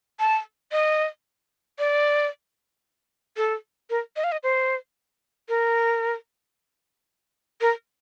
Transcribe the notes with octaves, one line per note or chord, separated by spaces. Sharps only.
A5
D#5
D5
A4
A#4
D#5
F5
D#5
C5
A#4
A#4